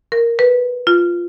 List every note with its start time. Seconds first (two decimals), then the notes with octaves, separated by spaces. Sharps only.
0.12 A#4
0.39 B4
0.87 F4